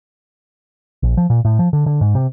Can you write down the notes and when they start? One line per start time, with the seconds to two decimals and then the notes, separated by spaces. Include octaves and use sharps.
1.03 A#1
1.17 F3
1.30 A#2
1.45 A2
1.59 F3
1.73 D3
1.86 D3
2.01 G#2
2.15 C3